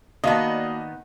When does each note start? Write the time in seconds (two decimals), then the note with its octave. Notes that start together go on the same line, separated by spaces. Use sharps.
0.24 D#3 A#3 B3 F#4 D5 D#5 F5 A5